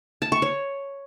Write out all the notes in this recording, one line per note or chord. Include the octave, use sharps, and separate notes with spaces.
A5
C#6
C#5